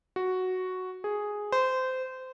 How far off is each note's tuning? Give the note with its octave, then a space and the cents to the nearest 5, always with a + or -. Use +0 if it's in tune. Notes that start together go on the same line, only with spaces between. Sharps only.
F#4 +0
G#4 +0
C5 -20